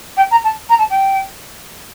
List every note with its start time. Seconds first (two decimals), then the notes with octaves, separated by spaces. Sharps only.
0.16 G5
0.30 A#5
0.44 A5
0.69 A#5
0.78 A5
0.90 G5